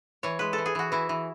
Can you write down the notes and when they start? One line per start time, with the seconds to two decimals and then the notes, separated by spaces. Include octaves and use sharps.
0.23 E3 C#5
0.39 G#3 B4
0.53 A4
0.58 E3
0.66 G#4
0.75 E3 F#4
0.92 E3 E4
1.09 E3